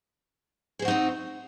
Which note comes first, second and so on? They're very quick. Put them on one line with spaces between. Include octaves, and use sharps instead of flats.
G#4 C5 F#4 D#4 C4